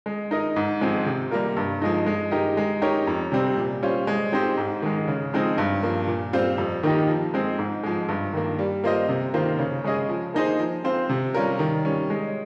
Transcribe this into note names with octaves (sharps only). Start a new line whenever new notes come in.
G#3
D#4 A#4 D#5
G#2
F3 G#3 C4
C3
G3 A#3 F4 A#4
G2
F3 G#3 D#4
G#3
D#4 G4 A#4 D#5
G#3
D#4 G4 A#4 C#5
F2
C3 G3 C4
A#2
G3 C#4 F4 C5
G#3
C4 D#4 G4 C5
G#2
D#3 G#3
C#3
F3 G#3 C4 D#4
G2
F3 A#3
A#2
G3 C4 F4 C5
F2
D#3 A#3 D#4 G4
F3
G#3 C4
G#2
F3 G#3
G2
D#3 A#3
G3
A#3 F4 C5 D#5
C3
D#3 A#3 F4 C5
C#3
G#3 C#4 G#4 D#5
F3
A#3 D#4 G#4 C5
F3
C4 F4 C5
C3
G3 C#4 F4 A#4
D#3
G3 C#4
G#3